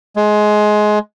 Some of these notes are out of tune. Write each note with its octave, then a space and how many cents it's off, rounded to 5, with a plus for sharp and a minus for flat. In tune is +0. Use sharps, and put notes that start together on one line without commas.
G#3 +20